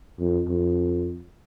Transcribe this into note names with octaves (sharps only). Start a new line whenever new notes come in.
F2
F2